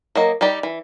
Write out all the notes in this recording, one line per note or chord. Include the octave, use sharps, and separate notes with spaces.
F#3 A#3 D#5
G3 D#4 G4 D5
E3